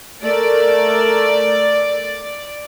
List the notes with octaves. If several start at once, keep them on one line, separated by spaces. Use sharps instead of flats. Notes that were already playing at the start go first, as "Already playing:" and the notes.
A3 A#4 D5